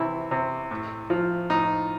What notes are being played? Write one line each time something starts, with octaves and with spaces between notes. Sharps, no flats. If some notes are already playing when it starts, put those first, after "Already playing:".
Already playing: C3 E3 E4
C3
A2
F3
A2 D#4